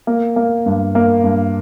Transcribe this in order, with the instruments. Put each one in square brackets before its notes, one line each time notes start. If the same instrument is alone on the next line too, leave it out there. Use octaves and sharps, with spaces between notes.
[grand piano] A#3
A#3
G2
A#3
G2